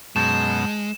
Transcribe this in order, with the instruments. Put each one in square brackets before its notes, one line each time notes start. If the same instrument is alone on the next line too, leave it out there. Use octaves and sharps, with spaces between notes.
[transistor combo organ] F#2 B2 [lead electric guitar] G#3 [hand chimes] A5 G6 A6 [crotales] E7